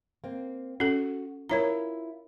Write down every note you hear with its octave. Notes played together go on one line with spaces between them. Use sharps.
A#3 C4
C#4 F#4 A4
E4 F4 A#4 C#5 A#5